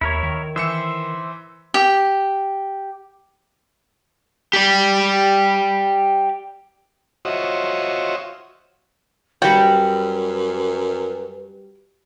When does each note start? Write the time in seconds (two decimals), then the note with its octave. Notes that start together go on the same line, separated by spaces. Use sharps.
0.01 D#2 E4 A#4 C#5
0.23 D#3
0.56 E3 C5 E5 E6 C#7
1.74 G4
4.53 G4 D5
7.25 F4 F#4 C5 C#5 D#5 E5
9.42 F#2 G3 F#4 B4 G5